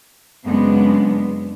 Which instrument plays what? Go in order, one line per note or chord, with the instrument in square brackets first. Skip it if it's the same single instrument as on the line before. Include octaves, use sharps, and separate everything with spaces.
[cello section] F#2 C#3 G#3 B3 C4 D4